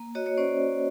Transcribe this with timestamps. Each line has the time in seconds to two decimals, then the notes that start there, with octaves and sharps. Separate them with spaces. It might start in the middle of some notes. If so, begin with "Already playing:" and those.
Already playing: A#3
0.15 F#4 C#5 D#5
0.26 C#5 D#5
0.37 C#4 C5 D5